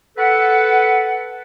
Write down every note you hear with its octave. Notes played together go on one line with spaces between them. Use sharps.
A4 B4 F#5